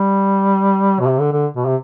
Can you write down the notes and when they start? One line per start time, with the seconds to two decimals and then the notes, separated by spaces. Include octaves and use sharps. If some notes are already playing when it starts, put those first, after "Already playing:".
Already playing: G3
1.00 B2
1.07 C3
1.20 D3
1.33 D3
1.56 B2
1.66 C3